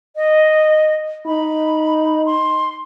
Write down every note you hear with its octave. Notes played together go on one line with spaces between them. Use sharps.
D#5
D#4 B5
C6